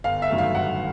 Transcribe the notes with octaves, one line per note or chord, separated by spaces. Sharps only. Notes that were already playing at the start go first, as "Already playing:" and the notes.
G1 F5
E5
G2 D#3 F#3 A3
F5
G1 F#5